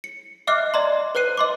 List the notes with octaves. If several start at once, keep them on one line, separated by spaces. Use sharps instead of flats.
C#7
D#5 E5 D6 F6 F#6 C7
D5 D#5 A#5 C6
B4 C5 F#6 C7 D#7
D#5 C6 D6